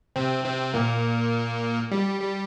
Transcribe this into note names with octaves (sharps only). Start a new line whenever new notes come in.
C3 C4
C3 C4
A#2 A#3
G3
G3